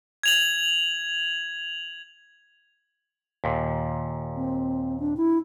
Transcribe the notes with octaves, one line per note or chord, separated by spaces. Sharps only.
G#6 F7 F#7
D#2 A#2
C4
D4
E4